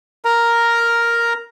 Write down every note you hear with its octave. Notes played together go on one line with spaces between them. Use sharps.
A#4 A#5